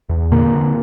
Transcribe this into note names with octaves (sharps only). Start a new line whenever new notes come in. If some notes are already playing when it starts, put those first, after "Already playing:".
E2
A#2 D3 A#3
D3